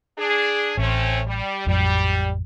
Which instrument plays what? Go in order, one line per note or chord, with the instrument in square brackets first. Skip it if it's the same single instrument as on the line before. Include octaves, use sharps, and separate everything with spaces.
[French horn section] D4 G#4
[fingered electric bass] A1 [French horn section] A3 C4 C#4
[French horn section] G3
[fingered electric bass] A1 F2 F#3 [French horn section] G3